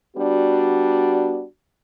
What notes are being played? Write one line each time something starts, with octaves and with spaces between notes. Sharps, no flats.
G3 B3 D4 F#4